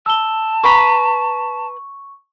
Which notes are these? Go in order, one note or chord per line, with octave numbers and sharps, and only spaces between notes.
A5 E6 G7
B4 A#5 B5 C#6